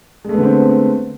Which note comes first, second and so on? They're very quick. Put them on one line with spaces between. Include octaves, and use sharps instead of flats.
G#3 A3 B3 D3 C4